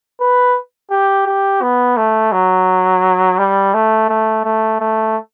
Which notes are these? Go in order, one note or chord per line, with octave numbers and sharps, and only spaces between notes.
B4
G4
G4
B3
A3
F#3
G3
A3
A3
A3
A3